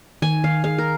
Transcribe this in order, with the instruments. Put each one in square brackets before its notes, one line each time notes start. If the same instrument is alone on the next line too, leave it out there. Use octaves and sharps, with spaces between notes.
[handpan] D#3 [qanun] G#5
[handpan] D#3 [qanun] F5
[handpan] G#4 [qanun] F5
[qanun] A#4